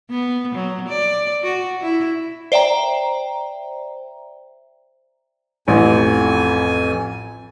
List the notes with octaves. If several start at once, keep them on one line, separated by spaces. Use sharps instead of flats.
B3
F#3
D5
F#4
E4
C5 D5 E5 G5 A#5
A1 F2 G#5